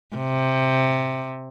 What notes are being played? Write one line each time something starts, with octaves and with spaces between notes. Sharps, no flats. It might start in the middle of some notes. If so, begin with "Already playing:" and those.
C3